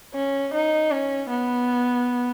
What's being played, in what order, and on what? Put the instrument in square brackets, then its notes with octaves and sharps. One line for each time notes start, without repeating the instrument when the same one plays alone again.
[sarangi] C#4
D#4
C#4
B3